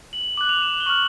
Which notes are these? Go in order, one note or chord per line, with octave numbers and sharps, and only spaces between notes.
F#7
D6 F#6 F#7
F7
E7
F7
G7
C#6 F6 F#7